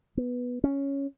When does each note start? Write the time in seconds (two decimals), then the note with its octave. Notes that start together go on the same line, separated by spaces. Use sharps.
0.17 B3
0.64 C#4